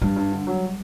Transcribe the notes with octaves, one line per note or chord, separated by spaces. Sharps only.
G2 G3
G2
D3
F#3